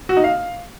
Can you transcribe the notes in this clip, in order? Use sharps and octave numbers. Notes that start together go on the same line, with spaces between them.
F#4
D#4
F5